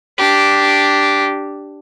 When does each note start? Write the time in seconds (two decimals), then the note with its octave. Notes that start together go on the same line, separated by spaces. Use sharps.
0.18 D4 G4